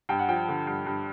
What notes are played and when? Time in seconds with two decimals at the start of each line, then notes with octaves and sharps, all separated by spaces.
0.09 G2 G5
0.19 F#5
0.28 F3 G5
0.49 D3
0.67 G2
0.86 G2